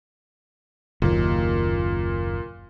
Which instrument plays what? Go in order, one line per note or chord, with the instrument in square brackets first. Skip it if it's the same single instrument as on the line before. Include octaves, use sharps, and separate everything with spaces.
[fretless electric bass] F#1 D#2 [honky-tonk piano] A#2